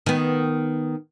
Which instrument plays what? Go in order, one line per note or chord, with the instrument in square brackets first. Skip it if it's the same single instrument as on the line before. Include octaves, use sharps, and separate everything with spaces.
[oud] D#3 B3